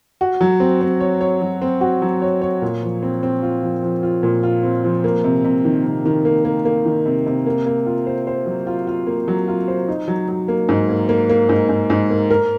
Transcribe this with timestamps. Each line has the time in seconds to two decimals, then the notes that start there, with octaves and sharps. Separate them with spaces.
0.21 F#4
0.41 F#3
0.60 C4
0.81 C4
1.00 C#5
1.21 C#5
1.41 F#3
1.62 C4
1.81 F#4
2.02 F#3
2.22 C#5
2.42 C#5
2.62 A#2
2.82 F3
3.03 C4
3.23 C4
3.42 F4
3.63 F3
3.83 F3
4.03 F4
4.23 A#2
4.43 F4
4.63 C4
4.84 F3
5.04 A#3
5.24 C3
5.44 C3
5.65 D#3
5.85 C3
6.05 D#3
6.25 A#3
6.45 A#3
6.65 A#3
6.86 D#3
7.06 C3
7.26 C3
7.46 A#3
7.66 A#3
7.86 F4
8.06 C5
8.27 C5
8.46 F#3
8.67 F4
8.87 F4
9.07 A#3
9.28 F#3
9.48 F4
9.68 C5
9.88 D#4
10.08 F#3
10.28 F#3
10.48 A#3
10.69 G#2
10.89 A#3
11.09 A#3
11.29 A#3
11.49 G#2
11.69 G#2
11.90 G#2
12.10 A#3
12.30 A#4